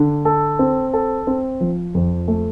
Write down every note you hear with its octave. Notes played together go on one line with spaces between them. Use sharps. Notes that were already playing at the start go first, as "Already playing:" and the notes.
Already playing: D3
A4
C4
A4
C4
F3
F2
A3